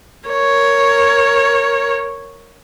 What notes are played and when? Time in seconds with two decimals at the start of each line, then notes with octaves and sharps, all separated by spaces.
0.28 A#4 C#5